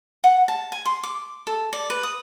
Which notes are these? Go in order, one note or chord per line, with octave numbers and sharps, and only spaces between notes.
F#5
A5
G#5
C6
D6
A4
D5
B4
D#6